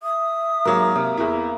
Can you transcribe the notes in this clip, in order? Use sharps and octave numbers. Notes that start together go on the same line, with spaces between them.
E5 D#6
G#2 F#3 G#3 A#3
C3 E5 F5
E2 E4